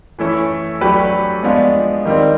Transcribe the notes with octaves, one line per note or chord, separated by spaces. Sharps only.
E3 A3 C#4 E4
F#3 A3 D4 G4 B4
F3 G#3 B3 D4 F4
D#3 G3 C4